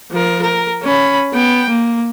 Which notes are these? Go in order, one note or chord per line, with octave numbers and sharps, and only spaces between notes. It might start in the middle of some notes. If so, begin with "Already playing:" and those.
F3 A#4
A#4
C#4 B5
B3 G5
A#3